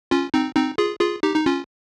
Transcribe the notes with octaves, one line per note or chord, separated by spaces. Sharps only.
C#4 F4
C4 D#4
C4 D#4
F4 G#4
F4 G#4
D#4 G4
D#4
C#4 F4